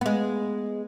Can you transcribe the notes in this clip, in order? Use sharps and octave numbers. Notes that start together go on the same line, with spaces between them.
G#3 B3